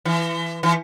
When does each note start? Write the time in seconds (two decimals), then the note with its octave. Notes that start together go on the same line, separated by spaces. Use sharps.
0.05 E3
0.63 E3